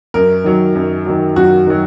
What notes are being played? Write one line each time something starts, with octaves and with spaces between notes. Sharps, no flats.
F#2 A#4
D#3 F#3
F#2
D#3 F#3
F#2 F#4
D#3 F#3